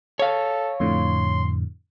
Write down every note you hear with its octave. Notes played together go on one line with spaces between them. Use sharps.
A4 C#5 F5
F2 A2 D3 C6